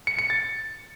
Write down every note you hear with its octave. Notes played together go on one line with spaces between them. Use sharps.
C#7
C#7
A6